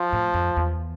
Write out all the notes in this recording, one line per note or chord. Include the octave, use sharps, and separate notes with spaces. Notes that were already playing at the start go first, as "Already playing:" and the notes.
Already playing: F3
A2
F2
E2